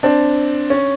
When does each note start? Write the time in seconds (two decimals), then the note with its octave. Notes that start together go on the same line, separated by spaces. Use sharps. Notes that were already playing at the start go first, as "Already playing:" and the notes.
0.03 C4 D4
0.70 C#4